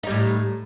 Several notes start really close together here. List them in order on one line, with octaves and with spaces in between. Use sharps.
D#4 G3 A2